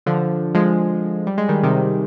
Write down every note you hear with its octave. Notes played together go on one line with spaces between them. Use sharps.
D3 F3
F3 G#3
G3
G#3
D#3 G3
C3 D#3